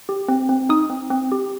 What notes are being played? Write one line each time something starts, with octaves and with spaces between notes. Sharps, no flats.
G4
C4
C4
D#4 D#6
C4
C4
G4